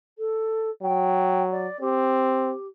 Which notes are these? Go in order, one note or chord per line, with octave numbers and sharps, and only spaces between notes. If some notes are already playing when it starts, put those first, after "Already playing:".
A4
F#3 G5
D5
C4 G4